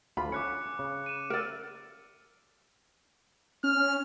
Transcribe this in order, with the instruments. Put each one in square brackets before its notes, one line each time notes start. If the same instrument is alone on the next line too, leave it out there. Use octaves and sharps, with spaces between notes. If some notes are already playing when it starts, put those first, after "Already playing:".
[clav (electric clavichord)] D2 D3 F4 [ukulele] B5
[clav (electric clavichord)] C#4 [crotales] D6 F#6 C#7
[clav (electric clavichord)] C#3
[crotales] D#7 E7
[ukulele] A#4 D5 [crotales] E6 D7
[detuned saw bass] C#4 [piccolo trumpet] F6